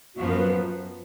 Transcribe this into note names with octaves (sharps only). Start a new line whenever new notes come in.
F#2 F3 B3 F#4
A#4
B4